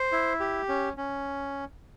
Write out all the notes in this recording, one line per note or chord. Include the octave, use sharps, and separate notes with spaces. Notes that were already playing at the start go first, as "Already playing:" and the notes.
Already playing: C5
E4
G4
C#4
C#4